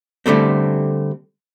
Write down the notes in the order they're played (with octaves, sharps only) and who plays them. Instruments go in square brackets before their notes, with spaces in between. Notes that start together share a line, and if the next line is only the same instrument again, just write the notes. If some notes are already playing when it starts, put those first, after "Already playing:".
[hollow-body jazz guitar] D3 G3 A3 C4